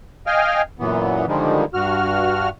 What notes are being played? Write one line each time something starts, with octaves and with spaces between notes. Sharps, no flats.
D#5 F5 G5 G#5 F6
F#2 A#2 E3 B3
D3 D#3 F3 G3 G#3
G2 F#4 F6